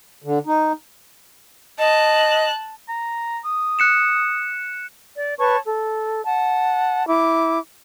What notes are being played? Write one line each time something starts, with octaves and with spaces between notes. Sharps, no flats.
D3
D#4
D#5 A5 F#6
A#5
D#6
F#6 C#7 E7
D5
B4 C#5 A5 C#6
A4
F#5 A5
E4 D6